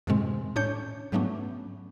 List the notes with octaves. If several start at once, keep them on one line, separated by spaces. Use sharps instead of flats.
F#2 A2 C3 D#3 G#3 C4
A2 C#4 D4 C#5 G6
G#2 F#3 A3 B3 C#4 D4